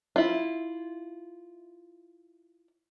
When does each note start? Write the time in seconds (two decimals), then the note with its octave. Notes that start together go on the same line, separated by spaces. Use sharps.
0.16 E4 F4